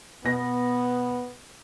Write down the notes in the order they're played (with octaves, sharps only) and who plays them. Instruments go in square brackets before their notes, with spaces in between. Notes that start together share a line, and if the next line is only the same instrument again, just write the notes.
[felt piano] B2 A#6 [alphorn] B3